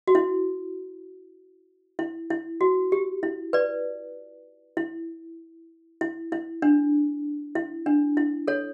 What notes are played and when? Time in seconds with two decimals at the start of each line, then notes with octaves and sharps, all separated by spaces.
0.07 F#4
0.15 E4
1.99 E4
2.30 E4
2.61 F#4
2.92 G4
3.23 E4
3.53 B4 D5
4.77 E4
6.01 E4
6.32 E4
6.62 D4
7.55 E4
7.86 D4
8.17 E4
8.48 A4 C#5